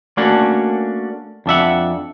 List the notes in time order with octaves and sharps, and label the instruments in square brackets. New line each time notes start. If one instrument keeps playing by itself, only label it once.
[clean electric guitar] A3 A#3 C#4 D4 F#4
F2 D4 E5 F#5